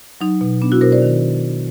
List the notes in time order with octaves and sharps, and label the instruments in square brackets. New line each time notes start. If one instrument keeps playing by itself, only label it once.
[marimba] F#3 D#4
B2
B3 D4
E4 F#4
B2 A#4 C5
C5 D5
D#3